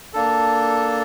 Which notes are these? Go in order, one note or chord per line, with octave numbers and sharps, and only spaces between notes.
A#3 D4 A4